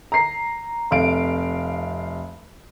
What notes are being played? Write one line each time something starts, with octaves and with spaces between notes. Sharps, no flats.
A#5 C7
F1 C3 F5 D7